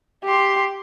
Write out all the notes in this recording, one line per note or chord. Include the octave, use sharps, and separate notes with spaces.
G4 C6